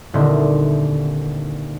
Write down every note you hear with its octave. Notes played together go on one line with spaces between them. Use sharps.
D#1 D3 C4 E4 D#5